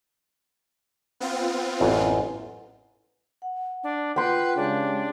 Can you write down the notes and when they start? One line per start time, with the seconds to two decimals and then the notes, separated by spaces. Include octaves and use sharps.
1.20 B3 C4 F4
1.80 A1 F#2
3.42 F#5
3.83 D4
4.16 F4 B4 F#5 G5 C6
4.57 C#3 G3 G#3 D4 G4